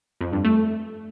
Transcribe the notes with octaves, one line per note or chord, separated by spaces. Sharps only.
F2
G2
A3